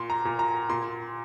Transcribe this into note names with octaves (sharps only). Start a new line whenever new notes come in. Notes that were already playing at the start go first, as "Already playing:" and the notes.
Already playing: A#2 C6
A#5
A#2
A#5
A#2 C6